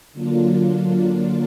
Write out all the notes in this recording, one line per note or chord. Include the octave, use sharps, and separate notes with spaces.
D3 F#3 A#3 D4 F4